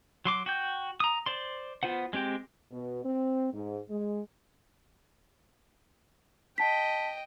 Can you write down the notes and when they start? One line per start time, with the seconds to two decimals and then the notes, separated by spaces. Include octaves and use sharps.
0.25 F#3 C6 D6
0.46 F#4 G5 G6
1.00 A#5 D#6
1.26 C5 D5 C6
1.83 B3 F4 C5 F#5
2.13 G#3 C4 G4 G5
2.71 B2
3.03 C4
3.53 G#2
3.89 G#3
6.58 D#5 G5 A5 B6